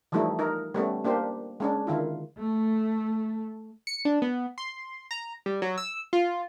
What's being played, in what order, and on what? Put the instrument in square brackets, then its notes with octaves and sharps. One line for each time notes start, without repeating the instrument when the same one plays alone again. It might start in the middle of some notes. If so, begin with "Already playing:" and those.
[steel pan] E3 F3 G3 A3 D#4 E4
D#4 A#4
G3 A3 B3 C#4
A#3 D4 G4 C5
G#3 C#4 D4
D3 D#3 E4 F4
[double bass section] A3
[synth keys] C#7
D4
B3
C6
A#5
G3
F#3
E6
F4